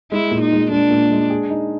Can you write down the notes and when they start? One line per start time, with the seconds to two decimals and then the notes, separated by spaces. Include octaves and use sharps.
0.12 G#3 E4
0.31 A#2
0.41 D#4
0.52 G#3
0.71 G#3 D4
0.91 A#2
1.11 G#3
1.30 G#4
1.50 D#4